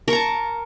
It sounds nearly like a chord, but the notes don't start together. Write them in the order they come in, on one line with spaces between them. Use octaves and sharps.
A#4 C#6 A#5 A5